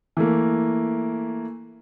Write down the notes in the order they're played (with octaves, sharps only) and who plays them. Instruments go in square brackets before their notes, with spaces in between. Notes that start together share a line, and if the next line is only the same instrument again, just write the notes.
[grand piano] E3 A3 A#3